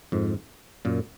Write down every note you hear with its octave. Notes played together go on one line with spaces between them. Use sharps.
F2 G#2
F#2 A#2